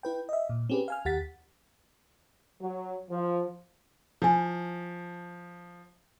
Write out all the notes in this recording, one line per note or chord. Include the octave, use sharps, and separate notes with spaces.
E4 B4 G5
D#5 E5
A#2
C4 C#4 G4 G#4 B4
F5 G#5 F6
D#2 G4 F#5 A6 B6
F#3
F3
F3 E4 G#5